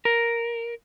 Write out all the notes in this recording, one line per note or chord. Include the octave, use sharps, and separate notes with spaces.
A#4